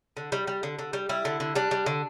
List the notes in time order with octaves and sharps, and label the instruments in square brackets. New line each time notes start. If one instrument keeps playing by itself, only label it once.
[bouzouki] D3
G3
G3
D3
D3
G3
G3 E4
D3
D3
G3 D4
G3
D3